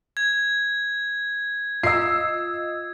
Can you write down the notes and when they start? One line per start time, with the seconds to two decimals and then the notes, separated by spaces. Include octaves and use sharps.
0.17 G#6
1.83 F4 D#5 E6 C7